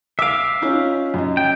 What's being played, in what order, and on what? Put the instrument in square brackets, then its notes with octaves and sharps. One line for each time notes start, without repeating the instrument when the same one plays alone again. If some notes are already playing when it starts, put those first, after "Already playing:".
[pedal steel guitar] E5 F5 [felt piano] D6 D7
[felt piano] C#4 D#4 F4
F#2 D#5
[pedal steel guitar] G5